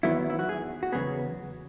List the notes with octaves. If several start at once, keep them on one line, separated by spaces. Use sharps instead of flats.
E2 D#3 F#3 B3 E4
E4
F#4
G#4
F#4
E2 C#3 F#3 B3 G#4